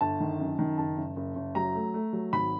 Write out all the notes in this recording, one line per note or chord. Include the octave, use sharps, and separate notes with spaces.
G1 A5
D#3
F#2
D#3
F#1 A5
F#1
F#1
F#1
F#3 A#5
A3
A3
F#3
G#1 B5